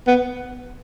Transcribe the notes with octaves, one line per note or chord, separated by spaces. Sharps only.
B3